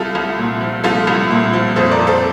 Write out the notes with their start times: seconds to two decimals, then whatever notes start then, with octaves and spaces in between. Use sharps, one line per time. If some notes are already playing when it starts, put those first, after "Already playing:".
Already playing: C2 F4 A4
0.15 C2
0.38 A#2
0.61 F3
0.84 C2 F4 A4
1.07 C2
1.30 A#2
1.53 F3
1.76 F2 A4 C5
1.91 A#4 D5
1.99 F2
2.07 A4 C5